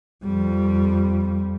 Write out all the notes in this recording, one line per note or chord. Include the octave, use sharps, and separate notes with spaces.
F2 G3